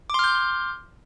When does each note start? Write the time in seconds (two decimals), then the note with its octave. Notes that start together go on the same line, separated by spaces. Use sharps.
0.10 D6
0.14 C6
0.19 F6
0.24 G6